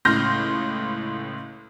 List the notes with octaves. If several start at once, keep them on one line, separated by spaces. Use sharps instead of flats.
C#2 A2 C6 F6 G6 A#6